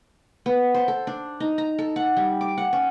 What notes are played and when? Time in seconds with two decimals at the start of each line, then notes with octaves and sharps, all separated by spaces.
0.46 B3
0.74 C5
0.88 A4
1.07 D4
1.40 D#4
1.58 A#5
1.79 A4
1.96 F#5
2.17 G3
2.41 D6
2.58 F#5
2.73 C#4